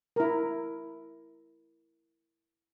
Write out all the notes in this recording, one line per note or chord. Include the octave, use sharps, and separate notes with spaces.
E4 A#4